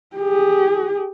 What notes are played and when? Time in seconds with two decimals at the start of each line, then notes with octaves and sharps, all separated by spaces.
0.16 G4 G#4